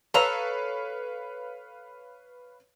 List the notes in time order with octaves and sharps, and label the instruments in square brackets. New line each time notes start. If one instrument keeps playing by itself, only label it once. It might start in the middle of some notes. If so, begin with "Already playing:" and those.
[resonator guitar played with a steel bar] A4 A#5 [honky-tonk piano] B4 C#5 F5